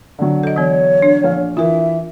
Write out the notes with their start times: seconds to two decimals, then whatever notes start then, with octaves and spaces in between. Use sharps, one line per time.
0.19 D3 F#3
0.43 A4 D#5
0.56 E3 B3 C#5
1.02 D4
1.23 A#1 F5
1.57 E3 F4 A#4 E5